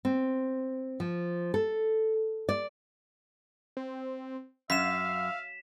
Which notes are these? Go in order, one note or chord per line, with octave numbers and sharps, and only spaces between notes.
C4
F3
A4
D5
C4
F#2 E5 F5 B6 E7